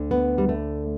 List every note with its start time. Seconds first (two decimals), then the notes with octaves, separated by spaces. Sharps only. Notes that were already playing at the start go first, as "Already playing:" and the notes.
Already playing: D2 D3
0.11 B3
0.38 G3
0.49 A3